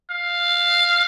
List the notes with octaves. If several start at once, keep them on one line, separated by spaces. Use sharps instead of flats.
F5